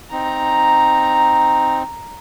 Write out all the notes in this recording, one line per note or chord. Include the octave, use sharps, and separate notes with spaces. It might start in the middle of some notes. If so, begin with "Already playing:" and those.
C4 D#4 A#5